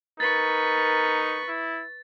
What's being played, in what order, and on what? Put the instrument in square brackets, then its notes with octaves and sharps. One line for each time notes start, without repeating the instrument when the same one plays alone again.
[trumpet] D#4 [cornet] A#4 [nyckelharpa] B4 C#6 [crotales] A6
[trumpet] E4